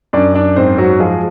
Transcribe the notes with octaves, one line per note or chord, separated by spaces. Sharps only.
F#2 D4 D5
D4 D5
G#2 C4 C5
F#3 F#4
F3 G#3 G#4